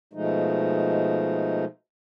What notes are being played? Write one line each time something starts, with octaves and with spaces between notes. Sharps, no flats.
B2 F3 G#3 A3 D#4